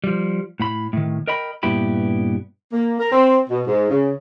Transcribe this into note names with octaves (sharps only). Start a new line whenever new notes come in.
F3 G3
A2 B5
A2 D#3
A#4 D#5 G5 B5
G2 A#2 B3 E4 G4 B5
A#3
A#4
C4
B2
G#2
C#3